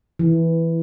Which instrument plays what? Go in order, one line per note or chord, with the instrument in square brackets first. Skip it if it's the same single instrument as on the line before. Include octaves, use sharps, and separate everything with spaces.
[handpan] E3